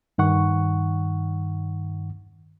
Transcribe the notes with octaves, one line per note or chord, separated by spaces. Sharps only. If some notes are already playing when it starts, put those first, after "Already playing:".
G2 D#3 F#5 C#6